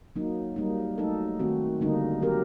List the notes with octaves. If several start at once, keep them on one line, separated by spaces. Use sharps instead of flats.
F#3 A#3 D#4
G3 A#3 D#4
F#3 A3 D#4 A4
D#3 A3 C4 F#4
D3 G3 A#3 D#4
F#3 C4 G4 A#4